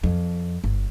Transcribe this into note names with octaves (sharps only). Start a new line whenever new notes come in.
F2
G1